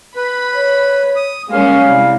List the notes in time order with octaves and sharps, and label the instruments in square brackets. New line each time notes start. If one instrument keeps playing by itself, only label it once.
[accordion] B4 [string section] B5
[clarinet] C#5
[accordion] D#6
[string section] G3 G#3 C#4 [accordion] A#3 [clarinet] F5
[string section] C2 [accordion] G3